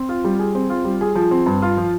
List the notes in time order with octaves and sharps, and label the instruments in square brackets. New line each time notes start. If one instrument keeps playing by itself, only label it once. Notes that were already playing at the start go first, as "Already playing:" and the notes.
Already playing: [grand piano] C4
F4
G3
G#4
C4
F4
G3
G#4
F3
C4
G2
F4
F3